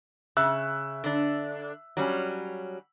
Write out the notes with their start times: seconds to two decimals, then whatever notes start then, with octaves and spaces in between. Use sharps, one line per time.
0.37 C#3 E5 E6 F#6
1.04 D3 D4
1.97 F#3 G3 C#4